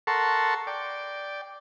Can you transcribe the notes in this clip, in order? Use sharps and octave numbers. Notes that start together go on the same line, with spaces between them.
A4 A#4 F#5 A5 C6 C#6
D5 G5